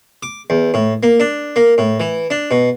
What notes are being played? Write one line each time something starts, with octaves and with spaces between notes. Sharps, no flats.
D6
E2
A2
A#3
D4
A#3
A2
E3
D4
B2